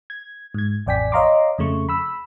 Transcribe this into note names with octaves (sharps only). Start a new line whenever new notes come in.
G#6
G#2 G#6
A1 F2 D5 G5 G#5 B6
C#5 D#5 F5 A#5 C6 D6
F2 C#3 A3 C#6
B5 E6